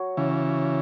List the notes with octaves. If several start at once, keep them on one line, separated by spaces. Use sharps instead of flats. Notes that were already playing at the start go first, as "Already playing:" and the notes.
Already playing: F#3 F#4 C#5
C#3 E3